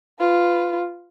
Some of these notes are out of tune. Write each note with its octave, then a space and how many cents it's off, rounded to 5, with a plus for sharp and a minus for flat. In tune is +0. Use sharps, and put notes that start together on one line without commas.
F4 +0 B4 +20